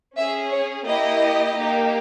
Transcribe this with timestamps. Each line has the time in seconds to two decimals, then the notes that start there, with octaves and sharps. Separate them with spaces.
0.17 C#4 G#4 E5
0.51 C#5
0.87 A#3 E4 G4 D#5
1.56 A#3 D#4 G4